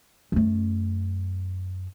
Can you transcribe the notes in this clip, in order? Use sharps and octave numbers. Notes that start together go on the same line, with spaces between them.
F#2 A3